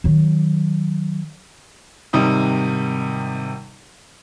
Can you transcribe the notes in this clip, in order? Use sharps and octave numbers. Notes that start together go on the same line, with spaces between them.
D#3 F#3
G#1 C3 G3 D#4 D#6